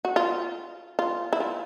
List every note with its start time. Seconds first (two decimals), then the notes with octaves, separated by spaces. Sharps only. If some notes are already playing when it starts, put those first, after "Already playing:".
0.05 F#4
0.16 F4
0.99 F4
1.33 E4
1.40 F4